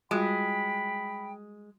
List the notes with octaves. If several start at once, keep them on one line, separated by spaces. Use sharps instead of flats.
G3 G#3 F4 F#4 G5 B5